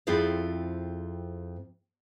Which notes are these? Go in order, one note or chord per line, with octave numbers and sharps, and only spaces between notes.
F2 C4 E4 F4 G#4 D5